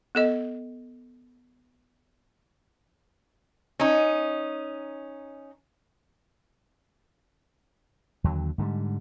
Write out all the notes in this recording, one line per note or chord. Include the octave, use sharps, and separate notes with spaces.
B3 A4 D#5
C#4 D#4
D#2 D3 F#3
G#2 D3 E3 G3